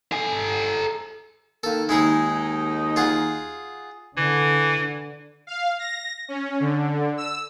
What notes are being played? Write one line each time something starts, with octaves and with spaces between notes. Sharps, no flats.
A4 G#5
D#3 A#3 A4
D#2 G#3 D#4 E4 G#4
F4 G#4 F#5
D3 E3
F5
A#6
C#4
D3
E6